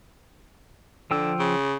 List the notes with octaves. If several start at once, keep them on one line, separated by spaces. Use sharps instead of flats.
D3 F3 G5 E6
C#3